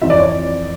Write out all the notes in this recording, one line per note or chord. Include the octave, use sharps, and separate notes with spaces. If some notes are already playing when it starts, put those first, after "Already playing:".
F2 E3 E5
D5
C#5
D5